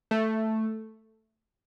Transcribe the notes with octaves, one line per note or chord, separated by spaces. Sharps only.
A3